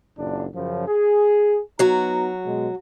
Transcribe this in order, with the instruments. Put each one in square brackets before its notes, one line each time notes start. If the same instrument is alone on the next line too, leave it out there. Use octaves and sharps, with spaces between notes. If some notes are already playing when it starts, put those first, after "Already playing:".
[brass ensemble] F#1 A#2 D4
F#2 C#3 F3
G#4
[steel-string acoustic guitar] F#3 F#4 [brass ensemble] B3 D#4 A#5
[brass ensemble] B2 G#3